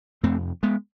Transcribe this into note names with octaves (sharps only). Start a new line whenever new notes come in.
F2 C3 A3 C4
G#3 B3